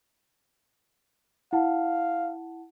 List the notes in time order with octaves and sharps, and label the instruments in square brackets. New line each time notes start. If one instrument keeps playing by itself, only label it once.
[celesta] E4 F#5 A5 [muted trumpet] F5